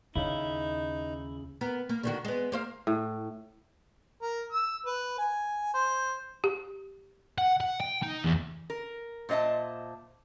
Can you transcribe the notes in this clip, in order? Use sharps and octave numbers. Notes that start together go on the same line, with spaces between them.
D#2 C#3 D#4 E4
B3 A#4
A#3
D3 D#3 F#4
G#3 B3
A#3 C5 F5
A2
A#4
E6
B4
G#5
C5
G4
F#5
F#5
G5
D#4
E2
A#4
A#2 C5 D#5 E5 A5